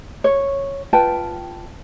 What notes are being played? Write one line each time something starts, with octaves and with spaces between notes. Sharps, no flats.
C#5
F4 B4 G5 A5